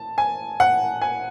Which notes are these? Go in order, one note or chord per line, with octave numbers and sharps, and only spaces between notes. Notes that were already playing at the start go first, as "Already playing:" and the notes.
Already playing: A5
G#5
F#5
G#5